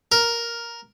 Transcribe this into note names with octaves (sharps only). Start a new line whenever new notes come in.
A#4